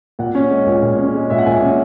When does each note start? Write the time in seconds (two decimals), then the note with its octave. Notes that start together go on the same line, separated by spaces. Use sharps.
0.19 A#2 F#5
0.35 C#4
0.50 G#3
0.67 A#2
0.83 A#2
0.98 C#4
1.15 G#3
1.30 A#2 E5
1.38 F#5
1.46 A#2 G#5
1.61 C#4